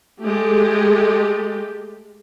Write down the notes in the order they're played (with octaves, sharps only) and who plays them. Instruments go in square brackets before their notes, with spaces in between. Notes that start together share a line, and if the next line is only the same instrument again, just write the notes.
[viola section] G#3 A3 G4